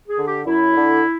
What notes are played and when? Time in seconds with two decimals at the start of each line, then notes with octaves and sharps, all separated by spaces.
0.08 G#4
0.17 D3
0.27 G4
0.46 F#2 E4
0.76 D3